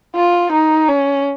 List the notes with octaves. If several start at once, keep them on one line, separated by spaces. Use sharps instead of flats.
F4
D#4
C#4